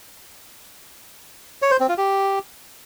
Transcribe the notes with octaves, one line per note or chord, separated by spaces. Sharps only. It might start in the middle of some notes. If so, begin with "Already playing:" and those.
C#5
C5
C4
F4
G4